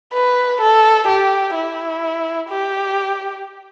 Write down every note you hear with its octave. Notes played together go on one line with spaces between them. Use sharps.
B4
A4
G4
E4
G4